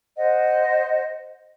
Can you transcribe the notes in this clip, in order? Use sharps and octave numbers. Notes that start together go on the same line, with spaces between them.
C5 D#5 F#5